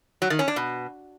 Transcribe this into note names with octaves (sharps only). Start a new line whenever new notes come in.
F#3
D#3
C#4
D4
B2